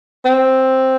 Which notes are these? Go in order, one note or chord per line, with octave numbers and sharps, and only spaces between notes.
C4